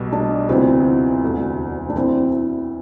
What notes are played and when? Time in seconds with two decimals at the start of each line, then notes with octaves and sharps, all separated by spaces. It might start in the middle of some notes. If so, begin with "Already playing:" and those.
Already playing: B1 B2 G3
0.13 D4
0.49 D2 C3 F3 B3 C4 E4
1.23 E1 D2 D3
1.90 D4
1.96 E3 C4 E4